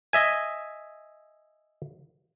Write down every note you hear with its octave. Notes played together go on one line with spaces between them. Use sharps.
D#5 E5 G#5